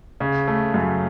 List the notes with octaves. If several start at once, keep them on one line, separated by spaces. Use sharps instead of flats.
C#3
A3
F#2